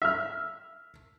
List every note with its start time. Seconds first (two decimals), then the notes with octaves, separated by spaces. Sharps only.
0.02 E5 F6